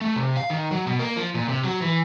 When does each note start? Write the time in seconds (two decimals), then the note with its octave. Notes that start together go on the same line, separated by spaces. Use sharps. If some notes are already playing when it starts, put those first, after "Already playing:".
0.01 A3
0.16 C3
0.37 F5
0.50 D#3
0.71 F#3
0.87 B2
0.99 A#3
1.17 F3
1.35 A#2
1.49 C3
1.64 F#3
1.82 E3